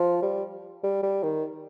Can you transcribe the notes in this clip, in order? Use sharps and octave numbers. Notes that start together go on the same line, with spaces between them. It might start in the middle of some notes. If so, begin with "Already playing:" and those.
Already playing: F3
G3
G3
G3
D#3